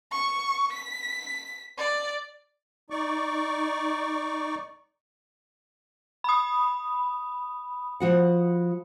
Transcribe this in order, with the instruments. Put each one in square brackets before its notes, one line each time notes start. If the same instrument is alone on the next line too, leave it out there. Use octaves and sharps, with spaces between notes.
[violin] C#6
B6
D5
[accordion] D#4 D5 C#6 D6
[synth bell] B5 D#6
[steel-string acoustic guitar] F3 F#4 F#5